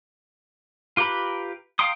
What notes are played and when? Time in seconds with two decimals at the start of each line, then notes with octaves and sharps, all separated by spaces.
0.97 F4 G4 B4 A#5 B5
1.79 F5 G5 A#5 C6 D#6